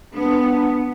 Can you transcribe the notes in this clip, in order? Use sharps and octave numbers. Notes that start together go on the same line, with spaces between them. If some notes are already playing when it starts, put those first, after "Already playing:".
B3 D4
D4